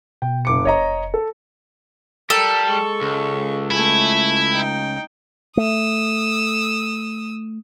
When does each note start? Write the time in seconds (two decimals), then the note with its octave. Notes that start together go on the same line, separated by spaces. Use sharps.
0.22 B2 G5
0.45 F#1 D6 C#7
0.65 F#1 C#5 D#5 A#5
0.77 F1
1.14 A4
2.30 G3 A4 A#4
2.69 G#3 C#6
3.02 C#2
3.71 A3 E4 G#5
4.53 D#4 G5
5.57 A3 D#6 E6